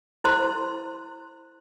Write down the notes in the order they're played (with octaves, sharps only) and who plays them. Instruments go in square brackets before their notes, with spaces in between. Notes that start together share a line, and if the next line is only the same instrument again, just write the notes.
[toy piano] E4 C5 C6